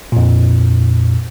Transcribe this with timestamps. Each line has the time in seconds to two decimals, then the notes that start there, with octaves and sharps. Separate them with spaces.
0.12 F2 A#2